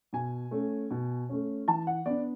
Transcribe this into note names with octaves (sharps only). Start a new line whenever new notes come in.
B2 G#5
A3 C#4
B2
A3 C#4
E3 A5
F#5
B3 D4 D5